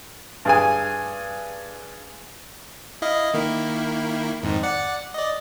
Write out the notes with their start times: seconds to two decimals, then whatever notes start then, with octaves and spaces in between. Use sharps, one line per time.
0.45 G2 G#4 G#5
3.02 E4 D#5 F5
3.34 D#3 A#3 E4
4.43 F2 G#2 D#3
4.63 D5 F#5 C#7
5.14 D5 D#5